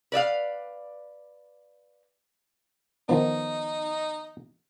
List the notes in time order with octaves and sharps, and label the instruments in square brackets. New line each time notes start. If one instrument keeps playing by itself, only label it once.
[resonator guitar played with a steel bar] B4 D5 E5 F5
[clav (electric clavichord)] D#3 F3 B3 [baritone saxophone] D#4